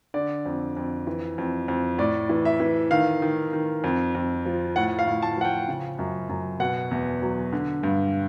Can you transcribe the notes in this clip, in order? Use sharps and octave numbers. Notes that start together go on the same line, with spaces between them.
D3 D5
F2
F2
E3
F2
F2
A2 D5
E3
E5
E3
D#3 F5
D#3
D#3
F2
F2
F3
A2 F#5
F5
A2
A5
F3 F#5
G5
C#3
F#2
F#2
B2 F#5
E2
F#3
D3
G2